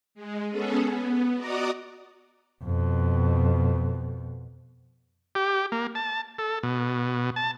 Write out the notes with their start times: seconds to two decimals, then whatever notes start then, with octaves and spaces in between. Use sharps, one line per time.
0.15 G#3
0.50 B3 C#4 G#4 A4
0.90 B3
1.36 F#4 D5 D#5 A#5 D6 D#6
2.64 F2 B2
5.35 G4
5.72 A#3
5.95 A5
6.39 A4
6.63 B2
7.36 A5